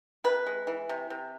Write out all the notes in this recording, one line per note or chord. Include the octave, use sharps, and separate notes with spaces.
C3 B4
G#3
E3
C3
C3